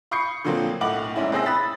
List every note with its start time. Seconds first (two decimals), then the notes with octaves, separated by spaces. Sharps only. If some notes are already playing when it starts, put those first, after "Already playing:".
0.11 B5 C#6 D#6 G6 C7 C#7
0.44 A#2 D3 F3 F#3 A#3 C4
0.81 B1 A2 F#5 D6 F#7
1.16 F1 G#2 C#4 E4
1.32 C2 C4 G#4 C5 E6 A#6
1.46 B5 D#6 E6 F#6 A6 B6